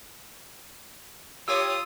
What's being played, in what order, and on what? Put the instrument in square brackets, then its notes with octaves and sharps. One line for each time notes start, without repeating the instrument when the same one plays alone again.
[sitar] A#3 G4 C#5 [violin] F4 D#6 [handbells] E6